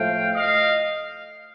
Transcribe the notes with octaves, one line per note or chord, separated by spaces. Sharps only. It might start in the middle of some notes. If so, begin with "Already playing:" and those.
Already playing: A2 F3 A3 F5 G5
D#5 F5